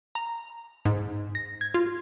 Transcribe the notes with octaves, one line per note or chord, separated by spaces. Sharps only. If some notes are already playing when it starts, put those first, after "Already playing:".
A#5
G#2
A#6
G#6
F4